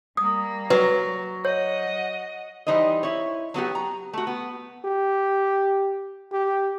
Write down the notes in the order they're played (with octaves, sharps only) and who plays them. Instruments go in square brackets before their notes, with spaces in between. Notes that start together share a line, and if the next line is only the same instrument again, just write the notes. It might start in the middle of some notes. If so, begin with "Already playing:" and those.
[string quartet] G3 A#3 [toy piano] D#6
[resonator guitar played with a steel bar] F#3 [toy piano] B4
[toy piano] C#5 [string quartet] D#5 F#5
[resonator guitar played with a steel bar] E3 G3 D#4 C5 D#5
E4 C#5
F#3 B3 F#4 G4
A#5
A3 F#4
B3
[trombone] G4
G4